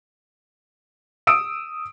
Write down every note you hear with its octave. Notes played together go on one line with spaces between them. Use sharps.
D#6 E6 D7